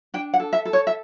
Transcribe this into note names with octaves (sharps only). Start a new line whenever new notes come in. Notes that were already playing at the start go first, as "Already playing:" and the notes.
D4 G5
F#5
A4
E5
A4
C#5
E5